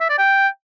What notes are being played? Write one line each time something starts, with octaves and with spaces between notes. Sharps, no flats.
E5
D5
G5